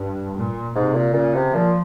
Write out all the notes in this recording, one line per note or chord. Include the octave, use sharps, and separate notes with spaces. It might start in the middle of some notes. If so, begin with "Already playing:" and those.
Already playing: G2
A#2
G#2 C3
A#2
A#2 C#3
C3
A#2 F3